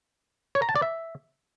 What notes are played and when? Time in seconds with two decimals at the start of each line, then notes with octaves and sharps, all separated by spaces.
0.55 C#5
0.62 A#5
0.69 A5
0.76 D5
0.82 E5